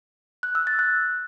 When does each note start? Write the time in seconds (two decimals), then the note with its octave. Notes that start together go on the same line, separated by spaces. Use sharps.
0.43 F#6
0.55 E6
0.67 A6
0.79 F#6